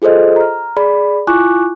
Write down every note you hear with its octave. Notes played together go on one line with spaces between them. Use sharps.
F4 G#4 A4 C5 D#5
A#5 F6
G#4 D5 B5
E4 F4 G#5 C#6 D6 F#6